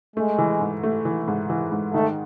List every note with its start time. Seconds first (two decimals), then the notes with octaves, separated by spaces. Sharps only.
0.16 G#3 A3
0.38 E3
0.61 G#2
0.83 A3
1.05 E3
1.28 G#2
1.50 E3
1.72 G#2
1.94 D#3 A3